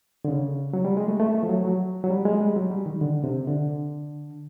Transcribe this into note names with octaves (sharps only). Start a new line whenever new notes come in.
D3
C#3
F#3
G3
G#3
A3
A3
A3
F3
F#3
F#3
F#3
G3
G#3
G3
F#3
G3
D#3
D3
C3
D3